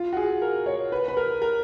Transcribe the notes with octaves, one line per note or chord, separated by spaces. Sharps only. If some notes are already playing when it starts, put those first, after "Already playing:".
Already playing: F4
F#4
G#4
A#4
C#5
B4
B4
A#4
A#4